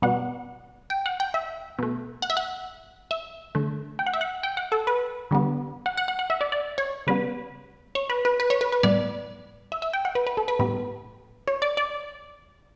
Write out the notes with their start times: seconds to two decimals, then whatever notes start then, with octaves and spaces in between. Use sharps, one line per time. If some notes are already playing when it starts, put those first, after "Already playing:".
0.02 B2 G3 B3 F#5
0.90 G5
1.06 F#5
1.20 G5
1.34 E5
1.79 B2 A3
2.22 F#5
2.30 E5
2.37 F#5
3.11 E5
3.55 D3 A3
3.99 G5
4.06 F#5
4.14 E5
4.21 F#5
4.43 G5
4.57 F#5
4.72 A4
4.87 B4
5.31 D3 G3 B3
5.86 F#5
5.97 F#5
6.08 F#5
6.19 F#5
6.30 E5
6.41 D5
6.52 D5
6.78 C#5
7.07 C#3 G3 B3 B4
7.95 C#5
8.10 B4
8.25 B4
8.40 B4
8.50 C#5
8.61 B4
8.72 B4
8.83 A2 G3 B3 D5
9.72 E5
9.82 E5
9.93 G5
10.05 F#5
10.15 B4
10.27 B4
10.37 A4
10.48 B4
10.59 A2 G3 B3 B4
11.48 C#5
11.62 D5
11.77 D5